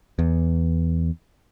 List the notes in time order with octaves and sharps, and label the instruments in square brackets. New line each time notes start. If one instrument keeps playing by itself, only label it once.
[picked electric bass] E2